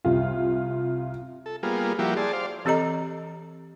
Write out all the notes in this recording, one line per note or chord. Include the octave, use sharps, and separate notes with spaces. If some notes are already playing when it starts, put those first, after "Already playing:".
C2 F4
A4
G3 A#3 B3 F4 G#4
F3 G3 A#3 E4 F#4 G4
G#4 D5 A5 C6
C5 D5 F5
E3 C4 G4 A4 D#5 A#5